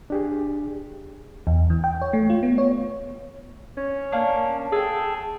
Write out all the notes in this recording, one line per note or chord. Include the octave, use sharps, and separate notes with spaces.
D4 G4 G#4
E2
E3
G5
C#5
A3
F4
B3
C#5
C#4
A#3 D4
G#4 A4 G5